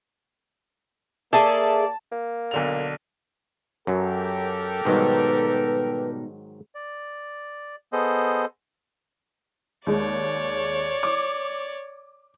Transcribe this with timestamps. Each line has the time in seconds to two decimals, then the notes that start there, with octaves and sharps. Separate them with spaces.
1.33 A#3 G#4 A4 D5 E5 A5
2.12 A#3
2.51 B1 D3 F7
3.87 F#2 F#3 G4 A4 A#4
4.85 G#2 B2 D#3 F#3 G3 D#4 B4
6.75 D5
7.92 B3 G#4 A4 C5 D#5
9.87 D#2 G#3 C#5 D5
11.03 D6